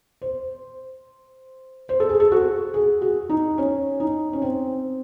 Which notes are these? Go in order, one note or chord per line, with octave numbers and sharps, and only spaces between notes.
C5
C5
A4
G#4
A4
F#4
G#4
F#4
D#4
C#4
D#4
C#4
C4